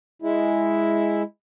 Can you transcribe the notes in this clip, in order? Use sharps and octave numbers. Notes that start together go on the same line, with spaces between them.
G#3 E4